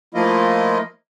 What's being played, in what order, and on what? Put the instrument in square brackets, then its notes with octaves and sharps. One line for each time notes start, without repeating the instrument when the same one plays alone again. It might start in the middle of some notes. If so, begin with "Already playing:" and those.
[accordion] F3 A3 A#3 E4 F4 D#5